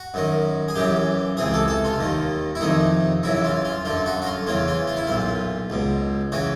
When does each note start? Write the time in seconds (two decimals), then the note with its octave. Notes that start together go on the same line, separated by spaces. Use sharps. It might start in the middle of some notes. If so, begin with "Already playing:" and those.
Already playing: F#4
0.14 F#2 D#3
0.68 G#4
0.75 F#2 C#3 E3 G4
1.37 C#2 C3 E3 G#4
1.54 A4
1.68 A4
1.85 F4
1.99 D#2 D#3
2.55 E4
2.61 F2 C3 D#3 D#4
3.23 F#2 C#3 E3 E4
3.44 F4
3.65 F4
3.85 F#2 D3 F4
4.06 F#4
4.22 F#4
4.26 F4
4.47 E2 C#3 E3 F4
4.68 F4
4.87 F4
4.97 E4
5.07 B1 A#2 F4
5.70 C#2 B2
6.32 C#3 E3 F#4